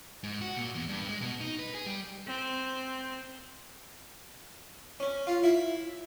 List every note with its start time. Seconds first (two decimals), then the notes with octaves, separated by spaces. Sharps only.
0.23 G#2
0.41 F#4
0.57 A#2
0.75 E2
0.89 G2
1.09 G#3
1.21 B2
1.41 D#4
1.59 B4
1.75 G#4
1.86 G3
2.27 C4
5.00 C#4
5.27 F4
5.43 E4